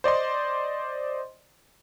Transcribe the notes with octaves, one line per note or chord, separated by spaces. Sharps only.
C5 D5 D#5 C6